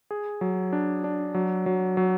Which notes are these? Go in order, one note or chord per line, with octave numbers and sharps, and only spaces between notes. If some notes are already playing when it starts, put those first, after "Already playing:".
G#4
F#3
D4
D4
F#3
F#3
F#3